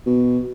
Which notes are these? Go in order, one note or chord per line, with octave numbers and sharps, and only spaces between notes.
B2